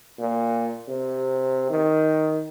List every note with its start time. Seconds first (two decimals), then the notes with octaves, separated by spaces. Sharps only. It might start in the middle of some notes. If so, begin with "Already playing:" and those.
0.19 A#2
0.88 C3
1.70 D#3